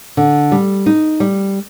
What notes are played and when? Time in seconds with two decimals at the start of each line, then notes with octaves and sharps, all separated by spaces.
0.17 D3
0.52 G3
0.86 D#4
1.20 G3